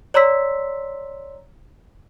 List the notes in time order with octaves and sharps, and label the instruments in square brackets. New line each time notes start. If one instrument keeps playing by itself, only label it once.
[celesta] C#5 D5 A#5 C6 E6 B6